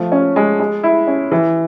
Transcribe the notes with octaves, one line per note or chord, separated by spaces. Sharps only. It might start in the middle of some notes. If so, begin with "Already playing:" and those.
Already playing: F3 A3
C#4
G#3
G#3
E4
C#4
E3